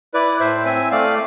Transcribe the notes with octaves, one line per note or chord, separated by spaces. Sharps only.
E4 B4 D5
A2 C5 E5
C4 E5 G#5
A3 D5 F5